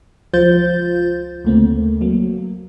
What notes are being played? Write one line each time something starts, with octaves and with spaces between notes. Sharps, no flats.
C#2 F3 F4 C5 G6 A6
D2 C#3 A3 A#3 C4
F#3 A#3